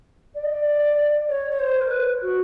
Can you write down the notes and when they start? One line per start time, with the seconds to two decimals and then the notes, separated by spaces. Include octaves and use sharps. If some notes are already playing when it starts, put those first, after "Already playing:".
0.35 D5
0.44 D#5
0.52 D5
1.28 C#5
1.50 C#5
1.59 C5
1.81 A#4
1.90 B4
2.22 F#4